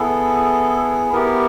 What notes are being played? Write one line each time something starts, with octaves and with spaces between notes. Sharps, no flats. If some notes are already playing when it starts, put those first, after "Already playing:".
Already playing: B3 E4 G#4 A4
B3 E4 G4 A#4